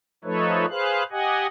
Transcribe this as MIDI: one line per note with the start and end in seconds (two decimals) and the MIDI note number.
0.24 0.66 53
0.24 0.66 57
0.24 0.66 63
0.24 0.66 69
0.24 0.66 71
0.24 0.66 73
0.70 1.03 68
0.70 1.03 71
0.70 1.03 72
0.70 1.03 77
0.70 1.03 90
1.11 1.47 67
1.11 1.47 75
1.11 1.47 78
1.11 1.47 80